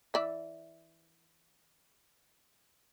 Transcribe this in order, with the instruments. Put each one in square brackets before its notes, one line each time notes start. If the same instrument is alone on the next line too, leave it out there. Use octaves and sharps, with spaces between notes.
[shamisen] E3 D5 E5